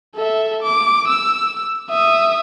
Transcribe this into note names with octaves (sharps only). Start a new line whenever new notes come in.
A4 E5
D6
E6
E5 D#6